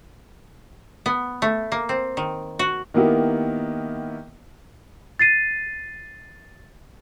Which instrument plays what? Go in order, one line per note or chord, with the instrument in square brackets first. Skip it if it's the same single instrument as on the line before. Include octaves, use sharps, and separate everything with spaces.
[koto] B3
A3
A#3
C4
D#3
F#4
[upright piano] D#3 A#3 B3 E4 G4
[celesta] A6 C7 D#7